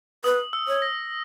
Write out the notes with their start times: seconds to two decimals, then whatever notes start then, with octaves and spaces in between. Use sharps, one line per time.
0.24 B4 D#6
0.53 E6
0.68 C#5
0.82 A#6